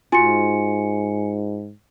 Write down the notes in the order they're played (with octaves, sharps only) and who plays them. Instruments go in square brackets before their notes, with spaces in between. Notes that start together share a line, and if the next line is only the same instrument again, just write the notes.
[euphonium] G#2 [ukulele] F4 F#4 [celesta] G#5 C#7